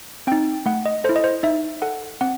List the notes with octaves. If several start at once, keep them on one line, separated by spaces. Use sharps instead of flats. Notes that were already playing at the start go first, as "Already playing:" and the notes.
C4 D#4 G5
A3 F#5
D#5
E4 A4 C5
D#5
C5
D#4 E5
A4 F#5
C4 F#5